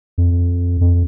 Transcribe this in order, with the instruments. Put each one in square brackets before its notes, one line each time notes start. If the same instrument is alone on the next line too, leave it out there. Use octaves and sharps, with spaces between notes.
[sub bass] F2
F2